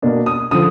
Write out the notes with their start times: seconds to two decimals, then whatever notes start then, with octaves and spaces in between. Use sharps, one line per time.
0.02 B2 A#3 D4
0.26 D#6
0.51 D3 F3 D#6